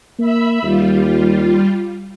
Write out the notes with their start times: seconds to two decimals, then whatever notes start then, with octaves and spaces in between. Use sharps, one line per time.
0.19 A#3 E5 B5 E6
0.63 D#2 G3 F4